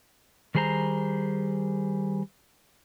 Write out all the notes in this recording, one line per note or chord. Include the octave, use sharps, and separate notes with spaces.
D#3 G3 G#4 C5 A#5